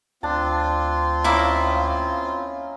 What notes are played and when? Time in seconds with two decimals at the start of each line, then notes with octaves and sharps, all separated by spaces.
0.23 D2 C4 D4 F4 A5
1.24 A#3 C#4 E4 D#5 E5 D6